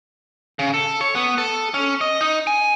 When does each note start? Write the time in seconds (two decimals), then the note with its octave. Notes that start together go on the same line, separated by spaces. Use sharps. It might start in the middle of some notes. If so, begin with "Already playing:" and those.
0.59 C#3
0.74 A4
1.01 C#5
1.15 B3
1.38 A4
1.74 C#4
2.01 D#5
2.21 D#4
2.47 G#5